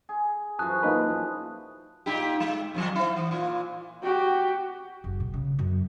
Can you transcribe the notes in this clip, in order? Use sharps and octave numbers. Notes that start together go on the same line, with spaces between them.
G#4
F#2 E3 F3 A5 D#6 F#6
A#3 D#4 B4
A#2 D#4 G4
G#3
F2 D#3 F#3
E4 C5
E3
A#2 F4
F#4 G4
F#1
A#2
C#3
F#2